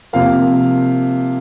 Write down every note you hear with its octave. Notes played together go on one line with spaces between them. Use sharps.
C3 F3 A#3 F5